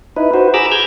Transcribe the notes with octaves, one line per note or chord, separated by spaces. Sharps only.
D#4 E4 B4
F#4 B4 C5
G#4 A#5 B5 D6 E6
F6 G6 G#6